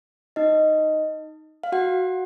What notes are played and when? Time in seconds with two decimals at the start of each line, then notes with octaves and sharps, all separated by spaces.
0.36 D#4 D#5
1.64 F5
1.72 F#4 F#5